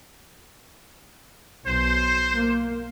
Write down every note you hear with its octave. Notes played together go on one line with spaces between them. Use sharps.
B1 C5
A#3